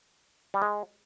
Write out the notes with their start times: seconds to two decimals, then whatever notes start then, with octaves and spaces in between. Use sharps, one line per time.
0.54 G3
0.62 G#3